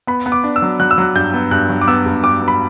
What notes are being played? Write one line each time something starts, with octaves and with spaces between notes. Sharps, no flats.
B3 B5
B3
D6
D4
E6
F#3
F#3 F#6
E6
F#3 F#6
G2 G6
B3
G2 F#6
F#3
D6
B3 E6
G2
G2 D6
B3
B5